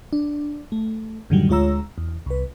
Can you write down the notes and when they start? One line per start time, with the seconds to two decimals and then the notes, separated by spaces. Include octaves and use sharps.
0.13 D4
0.72 A3
1.30 F#2 A2 D3 D#3 F#3 G3
1.49 D2 G#3 F4 C#5 A#5 E6
1.98 E2
2.26 C2 B4